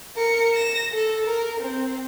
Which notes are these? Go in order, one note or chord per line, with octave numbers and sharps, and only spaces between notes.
A#4 C#7
A#6 E7
A4
A#4
C4